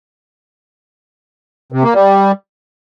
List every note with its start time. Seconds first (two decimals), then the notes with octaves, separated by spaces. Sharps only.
1.72 C3
1.83 A#3
1.94 G3